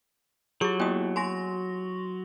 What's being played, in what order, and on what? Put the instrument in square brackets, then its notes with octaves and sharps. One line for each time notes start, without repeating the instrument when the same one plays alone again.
[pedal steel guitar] F#3 [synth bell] F4 G4 [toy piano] G#4 C#6
[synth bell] A#3 B3 E4 [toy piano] G5 D#6
[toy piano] F#4 G#5 [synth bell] C6 C#6 A#6